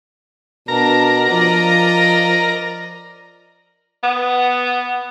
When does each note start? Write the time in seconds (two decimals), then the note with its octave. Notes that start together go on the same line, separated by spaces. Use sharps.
0.68 B2 D4 A#4 A#5
1.30 F3 D5 D#5
4.03 B3